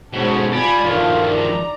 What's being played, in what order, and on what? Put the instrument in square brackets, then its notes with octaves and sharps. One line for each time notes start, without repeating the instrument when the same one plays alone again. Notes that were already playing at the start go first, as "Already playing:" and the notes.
[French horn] G#2 [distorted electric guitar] B2 C#4 [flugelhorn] F#4 [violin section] A4 C5 C#5
[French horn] F4 [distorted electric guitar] D5 G5 [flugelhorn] G#5 [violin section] B5 G#6
[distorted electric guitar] G2 F3 [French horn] D#3 [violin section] A3 D4 [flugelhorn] F4
[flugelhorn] D5 [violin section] A#5